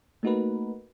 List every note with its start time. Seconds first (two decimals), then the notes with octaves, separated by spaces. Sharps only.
0.23 A3 A#3 D#4 F#4 A#4 B4